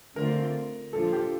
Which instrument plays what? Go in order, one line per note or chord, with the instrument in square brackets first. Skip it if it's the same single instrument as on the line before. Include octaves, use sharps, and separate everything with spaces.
[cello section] D3 A3 C4 F4 [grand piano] A#4
[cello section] A#2 F3 A#3 D4 F4 [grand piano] A4
[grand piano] G4